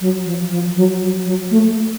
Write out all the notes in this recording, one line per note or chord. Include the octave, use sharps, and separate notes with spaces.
F#3
F3
F3
F#3
F#3
F#3
A3
A3